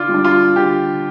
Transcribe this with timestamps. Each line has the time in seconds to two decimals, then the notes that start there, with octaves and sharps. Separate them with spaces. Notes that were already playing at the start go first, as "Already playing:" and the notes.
Already playing: D3 F4 D5
0.09 G3
0.14 D4
0.24 F4
0.56 D3 G4